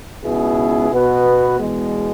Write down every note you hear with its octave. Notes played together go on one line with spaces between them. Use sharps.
C#2 B2 B3 E4 G#4
B2 B3 F#4 B4
E2 B2 G#3